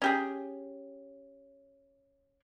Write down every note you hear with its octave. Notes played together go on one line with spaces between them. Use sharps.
C#4 G4 G#4